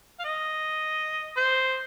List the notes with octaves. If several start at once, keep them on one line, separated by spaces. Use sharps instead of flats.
F5
D#5
C5